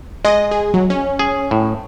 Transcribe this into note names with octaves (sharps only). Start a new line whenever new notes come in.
G#3 D#5
G#4
F#3
C#4
G#4
A2